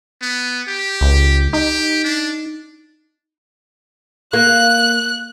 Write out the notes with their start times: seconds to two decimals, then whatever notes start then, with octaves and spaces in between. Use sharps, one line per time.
0.21 B3
0.68 G4
1.01 C#2
1.53 D#4 G4
2.04 D4
4.33 A#3 F#6